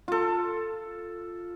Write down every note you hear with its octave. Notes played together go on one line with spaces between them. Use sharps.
F4 A4